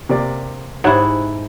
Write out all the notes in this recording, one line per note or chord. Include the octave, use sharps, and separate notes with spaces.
C3 A#3 D5
G#2 E4 G4 C#5 F#5